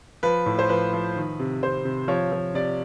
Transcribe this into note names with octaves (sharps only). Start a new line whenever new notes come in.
F3 B4
A2
C5
F3 B4
F3
D#3
C3
C3 C5
C3
F3 C#5
F3
C3 D5